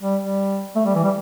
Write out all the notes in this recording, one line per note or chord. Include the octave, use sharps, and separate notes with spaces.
G3
G3
A3
G3
E3
G3